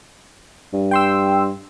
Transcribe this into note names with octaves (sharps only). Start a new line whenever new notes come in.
G2
G5 C6 E6